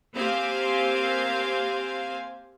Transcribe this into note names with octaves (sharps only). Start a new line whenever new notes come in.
A#3 C4 G4 C5 F5 G#5